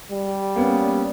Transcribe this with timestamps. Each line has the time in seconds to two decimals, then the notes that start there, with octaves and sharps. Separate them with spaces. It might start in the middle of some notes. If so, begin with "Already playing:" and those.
0.11 G3
0.56 A#3 B3 C#4